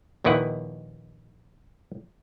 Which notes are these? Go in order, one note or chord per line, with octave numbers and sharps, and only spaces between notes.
A#1 D#2 D#3 E4 B4 F#5